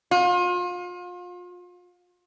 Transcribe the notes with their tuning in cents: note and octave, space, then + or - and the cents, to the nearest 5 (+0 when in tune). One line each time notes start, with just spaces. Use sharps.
F4 +35